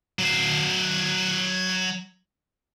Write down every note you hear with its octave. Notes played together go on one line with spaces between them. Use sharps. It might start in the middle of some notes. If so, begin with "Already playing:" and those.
F#3 C5